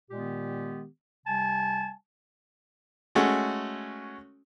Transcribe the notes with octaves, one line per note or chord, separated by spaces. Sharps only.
A#2 D#3 G#3 B3 G4
C3 G3 G#5 A5
G#3 A3 C#4 F#4